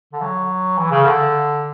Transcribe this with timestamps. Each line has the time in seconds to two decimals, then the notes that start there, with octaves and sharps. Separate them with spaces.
0.13 D3
0.22 F#3
0.78 E3
0.91 C#3
1.06 D3